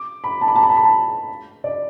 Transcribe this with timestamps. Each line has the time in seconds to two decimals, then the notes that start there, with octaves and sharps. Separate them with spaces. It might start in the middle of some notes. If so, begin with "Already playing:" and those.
Already playing: D6
0.24 B5
0.41 A5
0.48 B5
0.56 A5
0.63 B5
0.69 A5
0.77 B5
0.85 A5
1.64 D5